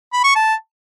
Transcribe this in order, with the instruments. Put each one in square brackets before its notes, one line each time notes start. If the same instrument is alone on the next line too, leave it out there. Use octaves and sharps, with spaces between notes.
[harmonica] B5
C#6
A5